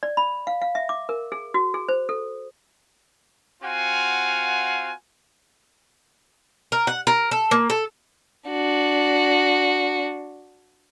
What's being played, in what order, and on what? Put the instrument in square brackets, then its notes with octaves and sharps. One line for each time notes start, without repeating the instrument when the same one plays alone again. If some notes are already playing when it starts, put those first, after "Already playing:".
[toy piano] D5
B5
F5
F5
E5
D6
A#4
G#4
F#4
G#4
C5
A4
[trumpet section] C4 F4 F#4 F5 F#5 G#5
[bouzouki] A#4
F#5
A#4
A4
A#3
A4
[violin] D4 F#4